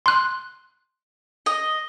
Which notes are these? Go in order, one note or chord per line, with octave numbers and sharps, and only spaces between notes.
C6 F#6
D#5